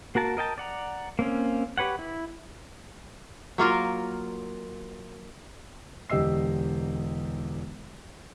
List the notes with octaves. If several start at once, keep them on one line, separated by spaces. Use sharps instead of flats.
A#3 F#4 A#4 A5
A#4 D#5 G5 A5
D5 F#5 A#5
A#3 C4 C#4
G4 B4 C#5 F#5
E4
F#3 A#3 F4 A#4
E1 D3 G4 D#5 E6 C7